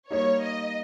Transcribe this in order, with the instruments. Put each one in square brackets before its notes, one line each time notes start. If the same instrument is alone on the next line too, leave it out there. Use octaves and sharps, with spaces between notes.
[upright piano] G3 A#3 D#4 [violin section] C#5
[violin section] D#5